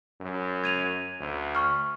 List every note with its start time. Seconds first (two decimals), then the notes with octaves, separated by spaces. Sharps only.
0.21 F#2
0.64 G#6 D#7 F7
1.19 D2
1.55 C#6 F6